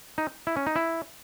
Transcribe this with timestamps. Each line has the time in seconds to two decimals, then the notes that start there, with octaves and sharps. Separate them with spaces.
0.18 D#4
0.47 E4
0.57 C#4
0.67 D#4
0.76 E4